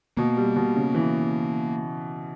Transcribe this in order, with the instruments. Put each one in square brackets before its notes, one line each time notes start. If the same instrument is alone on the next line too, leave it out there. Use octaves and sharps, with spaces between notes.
[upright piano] B2 [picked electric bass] A#3
[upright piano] G3
B2
C#3
E3